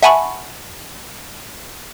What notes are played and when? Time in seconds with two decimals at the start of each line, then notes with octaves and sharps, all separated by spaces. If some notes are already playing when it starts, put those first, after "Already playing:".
0.03 E5 F#5 G#5 A5 B5 C#6